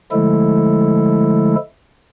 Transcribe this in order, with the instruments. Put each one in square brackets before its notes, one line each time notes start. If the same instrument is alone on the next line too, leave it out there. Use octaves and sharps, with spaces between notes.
[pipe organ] D3 F3 G#3 A3 E4 A4